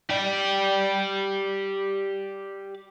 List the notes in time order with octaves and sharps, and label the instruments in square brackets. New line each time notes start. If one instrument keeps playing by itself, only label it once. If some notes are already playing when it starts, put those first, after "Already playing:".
[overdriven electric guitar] G4 D5